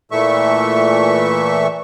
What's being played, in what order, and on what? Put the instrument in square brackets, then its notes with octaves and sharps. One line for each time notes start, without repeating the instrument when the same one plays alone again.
[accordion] A#2 E3 A3 E5 C#6